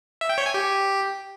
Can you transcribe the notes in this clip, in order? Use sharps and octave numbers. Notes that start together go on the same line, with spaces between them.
E5
G5
C#5
G#5
G4